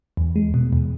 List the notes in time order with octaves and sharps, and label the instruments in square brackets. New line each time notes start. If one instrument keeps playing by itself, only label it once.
[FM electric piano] E2
G#3
B2
E2